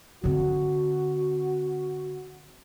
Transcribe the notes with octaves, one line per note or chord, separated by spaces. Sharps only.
D3 C4 F#4